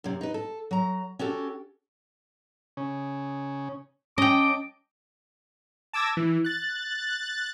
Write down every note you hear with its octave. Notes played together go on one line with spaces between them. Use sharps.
F#2 C3
D#4 B4
A4
F#3 A#5
C#4 F#4 G4 A4
C#3 C#4
C#4 D#5 G5 A5 D6
A5 D6 E6 G#6 A#6
E3
F#6 A6